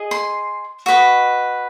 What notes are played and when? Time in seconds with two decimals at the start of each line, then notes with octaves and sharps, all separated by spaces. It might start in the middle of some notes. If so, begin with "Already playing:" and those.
Already playing: G#4 D#5
0.11 C6
0.86 F#4 B4 D#5 C#6